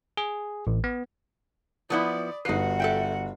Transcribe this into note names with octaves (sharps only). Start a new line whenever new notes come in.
G#4
A1
B3
F3 B3 E4 D5 B5 D#6
G1 D#4 F#4 B4 F#5 C7
A4 E5 G5